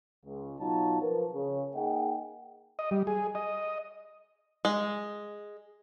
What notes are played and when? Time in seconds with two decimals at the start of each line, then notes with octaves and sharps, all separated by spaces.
0.25 C#2
0.59 B2 F#3 D#4 F4 A5
1.02 F3 A#4 B4
1.32 C#3
1.75 A#3 D#4 G#4 D#5 F#5 G5
2.79 D#5
2.91 G3
3.07 G#4
3.35 D#5
4.65 G#3